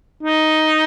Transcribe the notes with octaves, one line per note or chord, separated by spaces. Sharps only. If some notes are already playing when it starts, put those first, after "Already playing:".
D#4